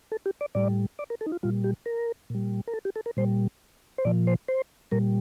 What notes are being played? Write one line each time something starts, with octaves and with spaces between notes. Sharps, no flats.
A4
G4
D5
A2 G3 D5
D5
A#4
A4
D#4
F4
A#2 G3 F4
G4
A#4
A#2 G3
A#4
A4
G4
A4
A#4
A#2 G3 C5
C5
A#2 F3 D5
C5
C5
A#2 G3 A#4